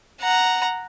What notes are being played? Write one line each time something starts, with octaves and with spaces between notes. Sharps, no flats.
F#5 A#5